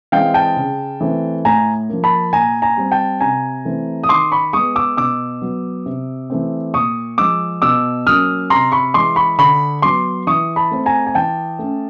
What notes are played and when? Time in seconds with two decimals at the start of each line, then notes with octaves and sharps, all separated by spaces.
0.12 E3 G#3 C4 F5 G5
0.34 G5 A5
0.56 C#3
1.01 E3 A3 C4
1.45 A2 G#5 A#5
1.89 F3 A#3
2.04 A5 B5
2.33 A#2 G#5 A#5
2.62 G#5 A#5
2.77 G3 C4
2.92 G5 A5
3.21 C3 G#5 A#5
3.65 E3 A3 C4
4.04 D#6
4.09 D#3 C6 D6
4.32 B5 C#6
4.53 G#3 B3 C#6 D#6
4.76 D6 E6
4.97 B2 D6 E6
5.42 F#3 B3
5.86 C3
6.30 E3 A3 C4
6.74 A#2 C#6 D#6
7.18 F3 G#3 D6 E6
7.62 B2 D6 E6
8.06 F#3 A#3 C#4 D#6 F6
8.50 C3 A#5 C6
8.72 B5 C#6
8.94 E3 G#3 C6 D6
9.16 B5 C#6
9.39 D3 B5 C#6
9.82 F#3 B3 C6 D6
10.27 E3 C#6 D#6
10.56 A5 B5
10.71 A3 C4
10.86 G#5 A#5
11.07 G#5
11.15 E3 G5 A5
11.59 A3 C#4